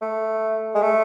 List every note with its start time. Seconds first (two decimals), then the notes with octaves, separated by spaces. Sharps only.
0.02 A3
0.75 G#3
0.82 A3